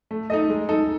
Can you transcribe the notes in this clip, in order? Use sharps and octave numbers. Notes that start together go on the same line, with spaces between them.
A3
D#4 A4 D#5
G#3
D#4 A4